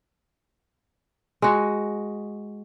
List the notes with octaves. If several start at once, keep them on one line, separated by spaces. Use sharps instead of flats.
G#3 F#4